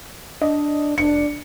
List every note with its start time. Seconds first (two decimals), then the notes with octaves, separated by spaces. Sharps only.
0.42 D4 D#5
0.98 F1 D4 C#7